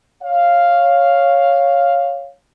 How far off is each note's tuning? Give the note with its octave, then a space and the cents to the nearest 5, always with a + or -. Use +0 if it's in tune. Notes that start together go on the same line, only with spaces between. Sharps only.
C#5 +0 F5 +0